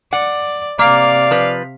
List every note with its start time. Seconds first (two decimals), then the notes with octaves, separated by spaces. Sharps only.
0.13 D5 F#5
0.79 C3 A#3 D5 F5
1.31 F3 B4